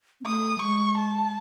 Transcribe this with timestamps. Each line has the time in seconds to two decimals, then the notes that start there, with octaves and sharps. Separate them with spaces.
0.21 C4
0.26 A3 D#6
0.58 F#3
0.62 G#3 C#6
0.98 A5